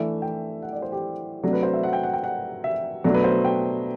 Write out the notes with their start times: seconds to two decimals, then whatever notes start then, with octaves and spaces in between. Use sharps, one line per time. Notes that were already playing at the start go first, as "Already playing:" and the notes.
Already playing: E3 A3 D4 E5
0.22 G5
0.62 F#5
0.72 D5
0.82 C5
0.92 G4
1.43 C3 F#3 A3 D4
1.53 B4
1.63 C5
1.73 E5
1.83 F#5
1.93 G5
2.03 F#5
2.13 G5
2.24 F#5
2.64 E5
3.04 B2 F#3 A3 D4
3.14 B4
3.24 C5
3.45 G5